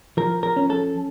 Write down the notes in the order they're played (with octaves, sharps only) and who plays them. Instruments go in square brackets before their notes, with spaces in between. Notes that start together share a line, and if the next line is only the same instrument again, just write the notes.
[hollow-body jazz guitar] F3 A#4
A#4
C#4
A4